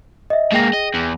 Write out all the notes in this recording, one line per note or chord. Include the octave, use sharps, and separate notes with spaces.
D#5 E5
G#2 A#3 G#4 G5 A#6
D#5
E2